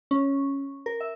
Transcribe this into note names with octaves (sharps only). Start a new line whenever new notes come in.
C#4
A#4
E5